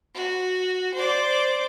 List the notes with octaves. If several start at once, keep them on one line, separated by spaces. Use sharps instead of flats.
F#4
C5 D5